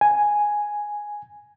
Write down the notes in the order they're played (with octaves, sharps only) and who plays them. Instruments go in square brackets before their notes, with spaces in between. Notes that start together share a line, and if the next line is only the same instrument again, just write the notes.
[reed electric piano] G#5